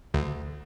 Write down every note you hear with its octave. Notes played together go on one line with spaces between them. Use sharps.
D2